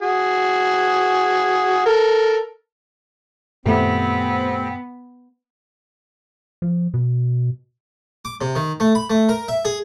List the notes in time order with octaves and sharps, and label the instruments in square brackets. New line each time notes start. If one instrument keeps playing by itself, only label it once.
[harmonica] F#4 G#4
A4 A#4
[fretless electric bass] F#2 A#2 D#3 [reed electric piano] A3 G4 [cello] B3 [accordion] C4
[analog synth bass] F3
B2
[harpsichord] D6
C3
D#3
A3
B5
A3
A#4
E5
G#4